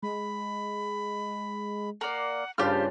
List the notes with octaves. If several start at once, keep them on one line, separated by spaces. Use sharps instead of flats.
G#3 B5
A#3 D5 F#5
G2 C#3 F4 G4 C5 F6